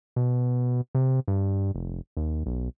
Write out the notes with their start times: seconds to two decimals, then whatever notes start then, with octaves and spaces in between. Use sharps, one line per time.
0.16 B2
0.95 C3
1.28 G2
1.75 F1
2.17 D#2
2.46 B1